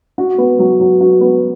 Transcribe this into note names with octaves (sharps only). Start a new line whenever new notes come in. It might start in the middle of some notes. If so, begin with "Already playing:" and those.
F#4
B3
F#3
F#3
F#4
B3